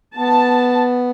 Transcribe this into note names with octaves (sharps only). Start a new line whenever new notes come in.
B3 A5